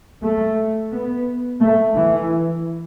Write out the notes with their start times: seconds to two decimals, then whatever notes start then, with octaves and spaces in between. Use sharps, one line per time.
0.22 A3
0.92 B3
1.61 A3
1.96 E3